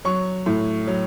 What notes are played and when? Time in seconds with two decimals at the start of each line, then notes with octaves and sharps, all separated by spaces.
0.05 F#3 C#6
0.46 A2
0.87 F#3